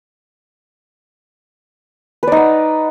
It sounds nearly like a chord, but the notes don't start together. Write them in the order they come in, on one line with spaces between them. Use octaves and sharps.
B4 D5 D#4 F#5